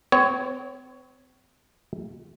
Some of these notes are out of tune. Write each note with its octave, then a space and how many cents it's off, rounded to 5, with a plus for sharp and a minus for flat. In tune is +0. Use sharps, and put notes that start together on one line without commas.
C4 -35 C#5 +0